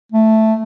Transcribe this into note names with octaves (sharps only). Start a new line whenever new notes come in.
A3